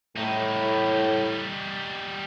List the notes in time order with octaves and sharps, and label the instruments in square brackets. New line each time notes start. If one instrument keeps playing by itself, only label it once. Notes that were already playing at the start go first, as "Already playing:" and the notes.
[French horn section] A2 [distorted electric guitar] G3 D#4